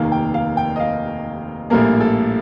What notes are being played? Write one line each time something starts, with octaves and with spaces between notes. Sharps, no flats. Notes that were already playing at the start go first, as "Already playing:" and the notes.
Already playing: F1 D#2 D#3 A#3 F5
G5
F5
G5
D#5
F5
A#1 A2 G3 A#3 A#4
A4